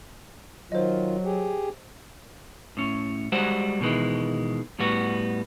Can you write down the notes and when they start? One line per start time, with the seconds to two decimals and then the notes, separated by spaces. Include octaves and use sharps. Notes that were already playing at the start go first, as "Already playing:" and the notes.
0.72 D#3 F#3 F4 C5 D#5
1.25 G4 G#4
2.77 A2 C#4
3.32 G3 G#3 F#4 C5 F#5
3.81 B2 D#3 E3 G#3
4.79 A2 G3 B3 F#4